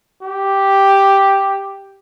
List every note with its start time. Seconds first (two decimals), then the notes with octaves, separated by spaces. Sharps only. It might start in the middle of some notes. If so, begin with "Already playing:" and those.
0.22 G4